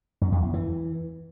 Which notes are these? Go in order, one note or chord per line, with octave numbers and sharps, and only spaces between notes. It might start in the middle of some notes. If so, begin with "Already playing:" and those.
F#2
F2
E2
E3